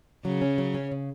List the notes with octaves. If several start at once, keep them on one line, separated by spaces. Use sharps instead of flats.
C#3 F#3
C#4
F#3
C#4
C#3